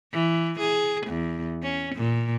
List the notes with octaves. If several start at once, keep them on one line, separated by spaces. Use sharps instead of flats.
E3
G#4
E2
C#4
A#2